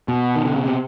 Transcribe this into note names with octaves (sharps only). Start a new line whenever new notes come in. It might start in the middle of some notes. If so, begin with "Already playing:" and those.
B2
D#3
D3
C#3
C3